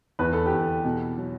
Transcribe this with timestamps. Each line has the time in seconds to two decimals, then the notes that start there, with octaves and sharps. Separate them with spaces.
0.19 E2 B4
0.33 A4
0.46 G4
0.52 E2
0.61 A4
0.84 B2
1.17 F#3